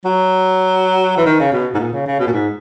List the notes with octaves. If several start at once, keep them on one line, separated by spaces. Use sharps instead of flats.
F#3
E3
D#3
C#3
B2
G#2
A#2
C#3
C#3
B2
A#2
G#2